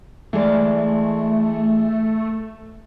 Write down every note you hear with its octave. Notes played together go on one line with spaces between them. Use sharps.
E3 G#3 A3 D5